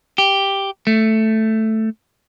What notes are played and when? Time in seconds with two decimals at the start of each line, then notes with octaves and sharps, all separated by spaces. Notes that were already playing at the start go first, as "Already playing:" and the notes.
0.18 G4
0.87 A3